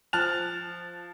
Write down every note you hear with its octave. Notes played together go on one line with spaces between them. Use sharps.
F3 A5 F6 F#6 A6 F7